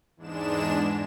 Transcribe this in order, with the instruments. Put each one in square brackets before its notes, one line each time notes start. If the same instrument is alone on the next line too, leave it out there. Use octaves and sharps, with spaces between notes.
[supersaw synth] E2 G#2 G#3 D4 E7